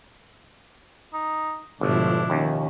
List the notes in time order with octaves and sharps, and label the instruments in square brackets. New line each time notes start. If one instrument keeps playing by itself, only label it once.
[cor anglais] D#4
[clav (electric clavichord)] G1 [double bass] G#2 D3 [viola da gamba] B2 F3 E4 [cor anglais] D4
[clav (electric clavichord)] D#2 [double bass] D#3 C#4